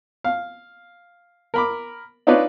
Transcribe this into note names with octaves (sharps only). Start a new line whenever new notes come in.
F5
A#4 B5 D6
D4 D#4 F4 B4 C#5 D5